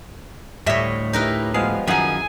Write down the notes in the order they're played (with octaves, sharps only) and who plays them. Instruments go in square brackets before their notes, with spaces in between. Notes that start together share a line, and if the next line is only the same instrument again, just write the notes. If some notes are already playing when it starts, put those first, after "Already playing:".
[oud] D2 A2 E5 [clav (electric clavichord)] G3 [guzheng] C#5 D#5
[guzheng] D#4 A#4 B4 [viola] E4 G4
[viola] F3 G3 [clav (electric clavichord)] G#3 B3 G#4 [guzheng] F5
[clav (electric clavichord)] F#2 F#5 A#5 [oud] D#3 F3 [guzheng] E4 G#4 [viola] G#5